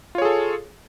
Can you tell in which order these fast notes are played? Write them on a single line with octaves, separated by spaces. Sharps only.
F4 C#5 G#4 A4